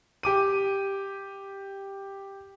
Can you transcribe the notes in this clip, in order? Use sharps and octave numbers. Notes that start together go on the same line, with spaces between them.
G4 D6 D#7